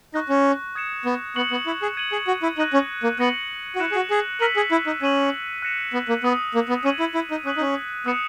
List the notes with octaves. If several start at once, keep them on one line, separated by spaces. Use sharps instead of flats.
D#4 C#6 F#6 A#6
C#4
D#6 G#6 C#7 E7
B3
B3 C#6 F#6 C#7 F#7
B3
E4
G#4
G#6 D#7 F#7
G#4
F#4
E4
D#4 F#6 A#6 D#7 F#7
C#4
A#3
B3 F#6 A#6 C#7 F#7
F#4
E4 F#6 C#7 E7
G#4
F#4
G#4
A#4 E6 B6 D#7 F#7
G#4
E4
D#4
C#4 G#6 D#7 F#7
F#6 A#6 C#7 E7
B3
A#3
B3 D#6 F#6 C#7 F#7
A#3
B3
C#4 D#6 G#6 D#7 F#7
E4
E4
D#4
C#4 D#6 F#6 B6 F#7
D#4
C#4
B3 D#6 F#6 C#7 E7